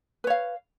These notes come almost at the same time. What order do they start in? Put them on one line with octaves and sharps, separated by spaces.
B4 C#5 F5